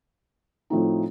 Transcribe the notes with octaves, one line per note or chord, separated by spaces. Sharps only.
A2 F3 A3 C4 D#4